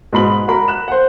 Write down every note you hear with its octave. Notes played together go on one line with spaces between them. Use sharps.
G#2 B2 B5 F#7
F#4 A#4 B5
F#6 E7
C5 F#5